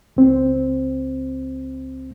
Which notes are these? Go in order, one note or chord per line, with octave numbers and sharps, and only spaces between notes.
C#2 C4